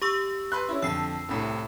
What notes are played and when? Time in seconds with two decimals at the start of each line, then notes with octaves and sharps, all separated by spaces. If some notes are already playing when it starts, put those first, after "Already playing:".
0.02 G4 C#6 E6
0.52 B4 C6 F#6
0.69 C#4 E4
0.82 F2 D3 E6 C7
1.29 C2 A2 C3